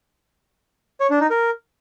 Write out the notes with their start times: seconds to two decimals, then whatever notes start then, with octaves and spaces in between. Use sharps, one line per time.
1.00 C#5
1.10 D4
1.20 D#4
1.30 A#4